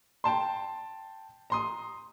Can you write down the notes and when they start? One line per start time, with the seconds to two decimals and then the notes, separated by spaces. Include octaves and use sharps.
0.24 G5 A5 C6
1.50 A#5 C6 D#6